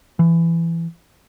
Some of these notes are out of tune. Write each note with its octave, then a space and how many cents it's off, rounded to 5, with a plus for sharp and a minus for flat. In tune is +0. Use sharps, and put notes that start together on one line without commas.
E3 +20